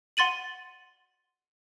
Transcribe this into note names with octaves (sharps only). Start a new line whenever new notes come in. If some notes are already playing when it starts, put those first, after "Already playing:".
F#5 C6 A6 D#7 F#7